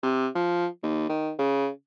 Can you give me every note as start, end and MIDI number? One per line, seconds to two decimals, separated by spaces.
0.03 0.28 48
0.35 0.67 53
0.83 1.06 39
1.09 1.31 51
1.39 1.68 49